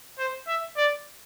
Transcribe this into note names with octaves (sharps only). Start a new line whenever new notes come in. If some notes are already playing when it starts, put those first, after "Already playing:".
C5
E5
D5